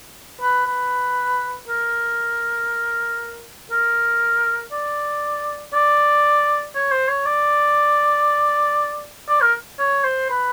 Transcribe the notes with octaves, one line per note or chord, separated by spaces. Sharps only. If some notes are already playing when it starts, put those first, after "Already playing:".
B4
B4
A#4
A#4
D5
D5
C#5
C5
C#5
D5
D5
A#4
C#5
C5
B4